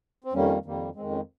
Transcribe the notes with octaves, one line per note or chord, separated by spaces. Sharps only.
C4
F2 D#3 G3 A#3 C#4
F2 D#3 G3 A#3
F2 D#3 G#3 C4
C#4